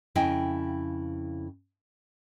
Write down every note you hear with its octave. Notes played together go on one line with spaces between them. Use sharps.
F2 C#3 E4 D#5 G5 G#5